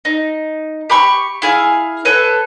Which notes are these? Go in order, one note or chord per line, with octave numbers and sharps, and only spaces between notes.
D#4
G4 B5 C#6
E4 G#4 F5
A4 B4 C#5